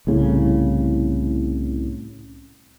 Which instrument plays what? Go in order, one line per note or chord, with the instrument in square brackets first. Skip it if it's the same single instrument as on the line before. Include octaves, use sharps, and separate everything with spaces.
[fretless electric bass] C2 A2 C#3